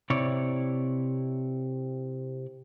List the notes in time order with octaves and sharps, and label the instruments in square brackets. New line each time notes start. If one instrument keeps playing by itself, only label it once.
[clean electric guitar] C3 E4 C#5 D5